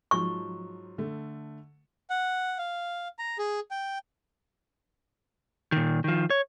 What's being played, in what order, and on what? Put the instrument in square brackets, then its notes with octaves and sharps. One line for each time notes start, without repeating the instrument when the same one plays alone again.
[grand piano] G#2 F3 F#3 [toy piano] C#6
[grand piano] D3 A3
[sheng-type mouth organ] F#5
F5
A#5
G#4
G5
[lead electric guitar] A#2 D#3
D#3 F3
C#5